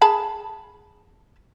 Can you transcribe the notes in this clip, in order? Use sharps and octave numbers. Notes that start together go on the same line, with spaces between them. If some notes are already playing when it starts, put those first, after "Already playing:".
G#4 A5 B5